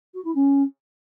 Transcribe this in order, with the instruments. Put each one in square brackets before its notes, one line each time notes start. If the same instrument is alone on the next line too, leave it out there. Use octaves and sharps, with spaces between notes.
[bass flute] F#4
E4
C#4